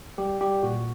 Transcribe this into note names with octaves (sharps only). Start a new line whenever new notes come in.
G3 G4
G3 G4
A#2 F#4